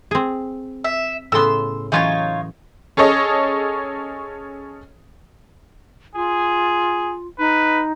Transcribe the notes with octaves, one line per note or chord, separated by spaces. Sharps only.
C4 G#4
E5
A2 C#3 B3 C6 E6
E3 F#3 C#4 D#4 F4 C#5
C#4 G#4 A4 C#5 D#5
F4 G#4
D#4 B4